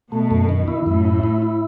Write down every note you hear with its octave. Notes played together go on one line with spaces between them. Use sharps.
B2 A3
F#2
D#3
E4
F#2 A2
E4
E4
E4